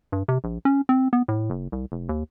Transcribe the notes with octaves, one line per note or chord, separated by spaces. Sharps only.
G2
C3
A#1
C#4
C4
B3
A2
F#1
C2
F1
D#2